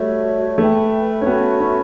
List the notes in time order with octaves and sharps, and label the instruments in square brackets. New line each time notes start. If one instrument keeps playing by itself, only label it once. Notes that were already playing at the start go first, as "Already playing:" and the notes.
Already playing: [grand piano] G3 A3 [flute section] F#4 C#5 E5
[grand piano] A3 [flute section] B4 E5 G5
[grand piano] C#4
[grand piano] B3 [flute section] F#4 A4 E5 B5
[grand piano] C#4